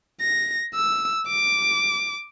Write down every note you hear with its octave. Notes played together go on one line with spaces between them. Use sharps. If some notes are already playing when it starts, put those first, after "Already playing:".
A#6
E6
D6